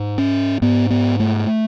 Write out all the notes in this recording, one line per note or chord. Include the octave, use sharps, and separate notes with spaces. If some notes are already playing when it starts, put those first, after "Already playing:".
Already playing: G#2
C#4
G#2 B3
B3
A3